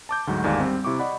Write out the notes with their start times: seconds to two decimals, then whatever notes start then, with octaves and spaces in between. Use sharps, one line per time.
0.09 A5 D6 G6
0.27 D2 G#2 F#3 F#4
0.43 G1 D#2 G#2 D5 F5 G#5
0.60 G3 C4
0.84 C3 E4 C#6 D6
0.99 D5 D#5 F#5 B5